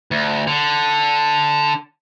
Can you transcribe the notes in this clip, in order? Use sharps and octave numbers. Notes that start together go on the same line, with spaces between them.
D2
D3